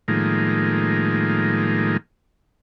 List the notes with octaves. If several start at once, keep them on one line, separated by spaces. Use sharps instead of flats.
A2 D#3 F3 G#3 A#3